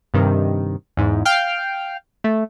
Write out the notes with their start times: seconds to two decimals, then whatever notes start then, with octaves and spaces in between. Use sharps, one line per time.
0.14 G2 C3 D#3
0.97 E2 G#2
1.25 F5 G5 F6
2.24 A3